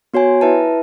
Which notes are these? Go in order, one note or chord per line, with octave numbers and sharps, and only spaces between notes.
B3 F#4 C#5 G#5
E4 B4 E5 A5